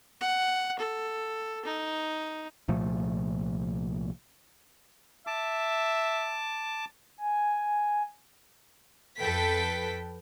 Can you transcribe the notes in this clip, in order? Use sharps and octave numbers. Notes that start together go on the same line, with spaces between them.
F#5
A4
D#4
C2 A#2 F3 A3
E5 A5 D6
G#5
F2 A4 B4 G5 B6